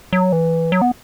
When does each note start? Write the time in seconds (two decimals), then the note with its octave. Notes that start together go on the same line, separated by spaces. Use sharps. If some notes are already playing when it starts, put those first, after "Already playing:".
0.13 F#3
0.32 E3
0.72 F#3
0.82 B3